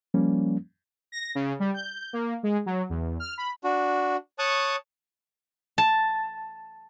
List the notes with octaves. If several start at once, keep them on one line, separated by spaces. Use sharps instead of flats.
F3 G3 A#3 C#4
A#6
C#3
G3
G6
A#3
G#3
F#3
E2
F6
B5
D4 F#4
C#5 A5 C#6 D#6 F#6
A5